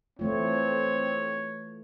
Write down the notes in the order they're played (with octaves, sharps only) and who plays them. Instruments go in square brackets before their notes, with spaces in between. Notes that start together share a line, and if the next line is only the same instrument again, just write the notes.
[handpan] E3 A3 F4 [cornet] C4 [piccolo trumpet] C#5